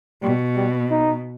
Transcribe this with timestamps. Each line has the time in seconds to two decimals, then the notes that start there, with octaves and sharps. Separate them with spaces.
0.22 B2 G3
0.56 G3
0.91 D#4